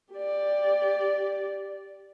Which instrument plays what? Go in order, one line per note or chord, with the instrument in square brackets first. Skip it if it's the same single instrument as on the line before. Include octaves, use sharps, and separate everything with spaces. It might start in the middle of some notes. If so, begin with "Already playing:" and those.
[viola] G4 D5